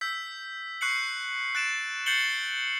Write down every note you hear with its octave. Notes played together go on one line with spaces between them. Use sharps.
E6 G6 B6
C#6 F#6 C7 C#7 F#7
F#6 A6 D7 E7
G6 A6 C7 C#7 F#7 G7